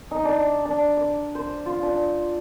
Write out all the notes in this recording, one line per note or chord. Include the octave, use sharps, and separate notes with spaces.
D#4
D4
D4
D6
C5
F4
D4